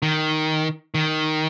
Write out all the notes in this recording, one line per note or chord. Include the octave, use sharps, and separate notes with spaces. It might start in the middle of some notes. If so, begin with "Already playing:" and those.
D#3
D#3